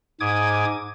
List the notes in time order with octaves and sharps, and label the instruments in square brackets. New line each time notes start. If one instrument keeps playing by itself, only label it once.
[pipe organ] G#2 D6 D#6 G#6